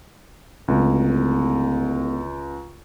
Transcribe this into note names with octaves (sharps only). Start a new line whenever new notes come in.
D1 C#2